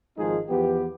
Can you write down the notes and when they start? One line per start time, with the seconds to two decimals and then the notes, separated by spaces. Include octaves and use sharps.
0.18 G#1 F3 G#3 D#4 F4 G#4
0.49 E2 F3 B3 G4